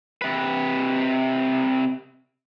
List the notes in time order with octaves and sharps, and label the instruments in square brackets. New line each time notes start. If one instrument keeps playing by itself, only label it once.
[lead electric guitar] C3 B4